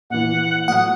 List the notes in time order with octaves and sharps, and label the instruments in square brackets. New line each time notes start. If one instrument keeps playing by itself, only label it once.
[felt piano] A#1 E3 [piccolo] F#5
[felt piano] A2 F#3 F#6 [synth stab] F#5 [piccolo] D#6